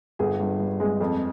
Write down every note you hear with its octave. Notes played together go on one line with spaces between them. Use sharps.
G1 G#4
G2
G2
G#3
F2